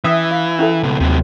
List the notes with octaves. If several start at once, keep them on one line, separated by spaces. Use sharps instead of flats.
E3 C#4 E5 D#6
F5
C#4 E4 A4
C#2 B2
D#2 C3 F#3